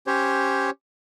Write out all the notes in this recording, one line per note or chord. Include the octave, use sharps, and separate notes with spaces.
C#4 G4 C5 C#5